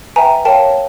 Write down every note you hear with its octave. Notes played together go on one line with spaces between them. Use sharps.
B4 E5 G5 G#5 A#5
A#4 C#5 F5 G5 A5